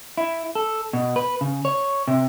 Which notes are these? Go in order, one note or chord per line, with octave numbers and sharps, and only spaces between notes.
E4
A4
B2
B4
C#3
C#5
C3